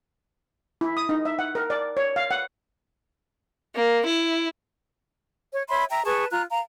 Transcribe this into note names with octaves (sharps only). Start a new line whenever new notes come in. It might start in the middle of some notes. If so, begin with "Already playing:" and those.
E4
D#6
D#4
E5
F#5
A#4
D5
C#5
F5
F#5
A#3
E4
C#5
C#5 E5 B5 C6
E5 G5 A#5
G#4 B4 A5 C#6
F4 A#5 F#6
F5 A#5